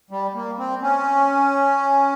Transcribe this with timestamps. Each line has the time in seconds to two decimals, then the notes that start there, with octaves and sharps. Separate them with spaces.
0.11 G3
0.35 A#3
0.58 C4
0.82 C#4